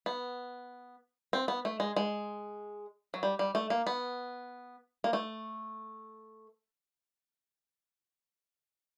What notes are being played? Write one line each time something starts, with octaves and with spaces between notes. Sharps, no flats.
B3
C4
B3
A3
G#3
G#3
F#3
G3
G3
A3
A#3
B3
A#3
A3